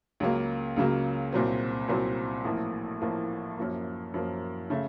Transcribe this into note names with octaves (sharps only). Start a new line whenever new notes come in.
C#2 C#3 F#3 A#3
C#2 C#3 F#3 A#3
C2 A#2 F#3 C4
C2 A#2 F#3 C4
A1 A2 F3 A#3
A1 A2 F3 A#3
F#2 F3 A#3
F#2 F3 A#3
C#3 A3